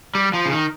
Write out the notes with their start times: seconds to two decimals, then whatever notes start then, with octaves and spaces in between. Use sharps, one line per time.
0.15 G3
0.34 F3
0.46 C#3
0.52 D#3